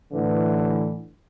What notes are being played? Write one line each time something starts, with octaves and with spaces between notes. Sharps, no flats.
A2 D3 E3